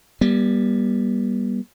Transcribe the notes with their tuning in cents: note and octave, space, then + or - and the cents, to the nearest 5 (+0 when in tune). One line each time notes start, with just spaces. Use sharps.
G3 +0 B3 -45